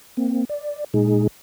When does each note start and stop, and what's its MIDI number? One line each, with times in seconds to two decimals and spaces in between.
0.17 0.45 58
0.17 0.45 60
0.49 0.84 74
0.94 1.27 46
0.94 1.27 56
0.94 1.27 63
0.94 1.27 68